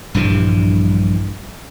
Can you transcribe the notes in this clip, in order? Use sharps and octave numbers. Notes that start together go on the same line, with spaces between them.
A#1 G2 E3 G3